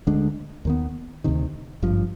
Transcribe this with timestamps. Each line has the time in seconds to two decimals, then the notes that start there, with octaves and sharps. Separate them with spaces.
0.07 D2 D3 G#3 D4
0.65 D#2 D#3 B3
1.24 D2 C3 D#3
1.82 G#1 G2 F3